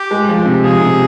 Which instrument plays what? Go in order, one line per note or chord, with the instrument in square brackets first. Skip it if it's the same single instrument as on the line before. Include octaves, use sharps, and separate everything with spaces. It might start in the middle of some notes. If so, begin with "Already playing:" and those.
Already playing: [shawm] G4
[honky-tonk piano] G#3
F3
C3
[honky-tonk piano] F3 [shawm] G#4
[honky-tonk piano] C3